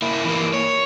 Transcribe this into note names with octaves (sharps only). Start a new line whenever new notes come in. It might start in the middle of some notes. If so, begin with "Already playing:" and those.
A#3 E4
E3 A#3
C#5